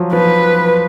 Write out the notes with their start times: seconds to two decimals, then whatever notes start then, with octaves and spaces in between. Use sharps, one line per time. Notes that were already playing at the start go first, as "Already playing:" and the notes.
Already playing: F3 F#3
0.13 F3 B4